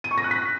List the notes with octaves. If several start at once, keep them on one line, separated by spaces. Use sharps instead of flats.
D#7
C#6
A#6
F#6
B6